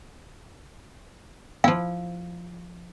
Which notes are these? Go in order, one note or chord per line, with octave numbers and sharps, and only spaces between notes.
F3 E4 F5